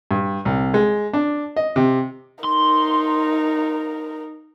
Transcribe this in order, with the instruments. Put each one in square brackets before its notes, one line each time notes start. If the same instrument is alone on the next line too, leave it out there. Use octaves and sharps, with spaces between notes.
[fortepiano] G2
C2
G#3
D4
D#5
C3
[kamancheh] D#4 A#4 [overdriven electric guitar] C6